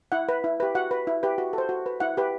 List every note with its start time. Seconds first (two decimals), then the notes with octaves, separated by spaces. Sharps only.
0.12 E4 F#5
0.29 B4
0.44 E4
0.60 G4 B4
0.75 F#4 F#5
0.91 B4
1.07 E4
1.23 G4 B4
1.38 F#4
1.53 A4 C5
1.69 F#4
1.86 B4
2.00 E4 F#5
2.17 G4 B4